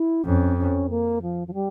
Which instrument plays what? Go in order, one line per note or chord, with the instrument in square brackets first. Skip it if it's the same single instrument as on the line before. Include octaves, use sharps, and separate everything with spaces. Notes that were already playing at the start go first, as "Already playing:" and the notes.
Already playing: [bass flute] E4
[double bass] F2 [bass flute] C#4
[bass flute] C#4
A#3
F3
F3
G3